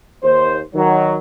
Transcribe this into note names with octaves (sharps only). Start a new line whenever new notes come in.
D#2 C5
D#3 F#3